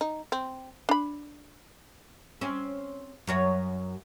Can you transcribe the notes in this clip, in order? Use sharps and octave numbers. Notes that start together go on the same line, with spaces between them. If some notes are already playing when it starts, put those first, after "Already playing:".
D#4
C4
D4 B5
C4 C#4
F#2 F#4 C#5